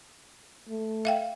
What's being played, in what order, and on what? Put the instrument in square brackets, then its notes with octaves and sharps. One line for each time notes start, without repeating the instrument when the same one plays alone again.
[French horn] A3
[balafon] E5 F5 G5